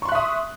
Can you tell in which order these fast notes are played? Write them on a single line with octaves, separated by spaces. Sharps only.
C#6 C6 F#6 E5 D#6